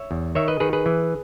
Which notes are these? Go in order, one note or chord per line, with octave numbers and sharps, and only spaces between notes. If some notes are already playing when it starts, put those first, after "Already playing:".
Already playing: C#5 E5
E2
D#3 C#5 E5
B4 D#5
D#3 G#4 B4
G#4 B4
E3